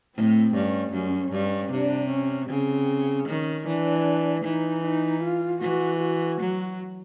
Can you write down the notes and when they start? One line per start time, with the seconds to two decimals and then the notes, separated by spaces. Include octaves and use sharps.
0.15 A2 C4
0.53 G2 C#4
0.92 F#2 C#4
1.31 G2
1.71 C3 D4
2.10 C#4
2.49 C#3 C4
3.27 D#3 C#4
3.66 E3 D4
4.44 E3 D#4
4.83 D#4
5.22 F4
5.61 E3 F#4
6.01 F#4
6.40 F#3